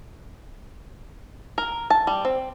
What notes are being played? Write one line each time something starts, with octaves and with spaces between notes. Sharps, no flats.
A#4
A5
G3
C4